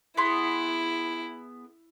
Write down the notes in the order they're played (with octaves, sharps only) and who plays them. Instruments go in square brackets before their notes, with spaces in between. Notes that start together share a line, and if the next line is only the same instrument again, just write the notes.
[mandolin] B3 G#4 C6 [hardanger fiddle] E4